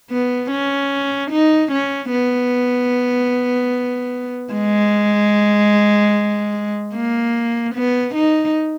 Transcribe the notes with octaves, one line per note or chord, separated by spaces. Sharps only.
B3
C#4
D#4
C#4
B3
G#3
A#3
B3
D#4